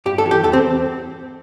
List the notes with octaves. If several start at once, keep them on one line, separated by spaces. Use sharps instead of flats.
G2 G4
A4
E3
G4
E2 A4
C4